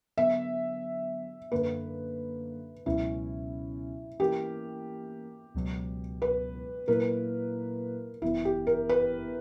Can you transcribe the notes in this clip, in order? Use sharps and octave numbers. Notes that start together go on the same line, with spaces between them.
D3 F#3 B3 E5
F#2 D3 A#3 B4
C#2 B2 F#3 C#4 E4
E3 A#3 C#4 E4 G4 A#4
C#2 B2 F#3
B4
A#2 F#3 A#3 E4 A#4 B4
G1 F#2 E3 B3 E4
G4
A#4
B4